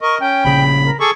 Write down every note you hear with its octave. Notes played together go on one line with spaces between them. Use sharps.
A#4 D#5 C#6
C#4 G5
A#1 C#3 B5
A#4
G#4 A4 C#6 D6